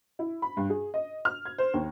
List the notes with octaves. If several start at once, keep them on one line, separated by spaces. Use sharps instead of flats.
E4
B5
G2
G#4
D#5
F6
G#6
C5
D#2